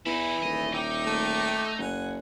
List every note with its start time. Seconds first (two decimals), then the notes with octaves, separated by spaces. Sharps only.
0.06 E2 E3 D#4 E4
0.43 D#1 A3 D#5
0.74 D#4 E5 G5 D6
1.07 A3
1.79 F#1 F#5 G#5